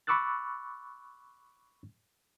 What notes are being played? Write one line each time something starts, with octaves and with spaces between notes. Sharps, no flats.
B5 C#6 D6 E6 F#6 A6